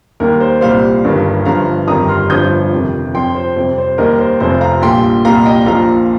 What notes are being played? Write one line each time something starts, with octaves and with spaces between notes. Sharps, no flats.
D#2 D#3 G3 A#4
C5
C2 A#2 G3 C5 F5
G1 G2 D#3
G1 G2 F3 F5 A#5
G1 F2 D#3 G3 A#5 D#6
C6 F6
G1 G2 F3 D#6 G6
F2 C3 D#3
F2 F3 G5 C6
C5
F2 C3 G3 C5
C5
D#2 D#3 G3 A#4 D#5
C5
F1 F2 F3 C5
F5 A#5
A#1 A#2 G3 G5 C6
C2 A#2 G3 F5 A#5
D#5 G5
A#1 A#2 F3 F5 A#5